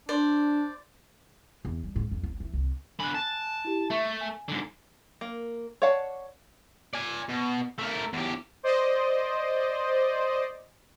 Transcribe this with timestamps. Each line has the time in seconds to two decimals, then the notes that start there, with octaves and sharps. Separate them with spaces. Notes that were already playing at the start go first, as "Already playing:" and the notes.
0.09 D4 C5 D5
1.65 E2
1.84 G3
1.96 G#2
2.11 F2
2.23 G1
2.40 E3
2.54 C2
3.00 D3 G#5 B5 F#6
3.14 A5
3.65 E4 G4
3.90 A3 E5 C#6
4.21 G#5
4.48 G#2 D3
5.21 A#3
5.82 C#5 D5 F5 F#5 A5
6.93 D5 G#5
7.29 B2
7.78 A3 A#4
8.13 E2 G4
8.63 C5 D5 D#5